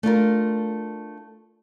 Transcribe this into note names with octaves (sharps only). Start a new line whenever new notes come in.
A3 D4 F4 A#4